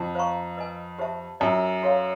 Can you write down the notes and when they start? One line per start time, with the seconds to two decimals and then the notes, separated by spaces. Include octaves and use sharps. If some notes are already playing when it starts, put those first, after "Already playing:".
Already playing: F2
0.15 C5 F5 A#5 C#6
0.57 B4 D#5 G#5
0.99 G4 C5 E5 A5
1.40 F#2 F4 A#4 D5
1.83 F#4 A4 C#5 F5 A#5